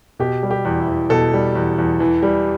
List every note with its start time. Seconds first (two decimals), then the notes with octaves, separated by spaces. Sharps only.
0.19 B2 G4
0.43 G3
0.51 G4
0.65 E2
0.80 E4
0.88 E2
1.10 B2 A4
1.33 G3
1.55 E2
1.78 E2
2.00 E3
2.23 G3